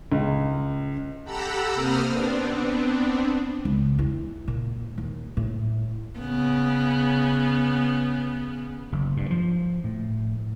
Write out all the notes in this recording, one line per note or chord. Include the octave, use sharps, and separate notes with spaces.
C#2
G4 A4 F#5 A#5 B5 E6
C3 A#3 C4 D#6 F6
B3 C4 D4
C#2
E2 E3
A#2
D#2
A2
C#3 B3
F#1
G2
F3
A2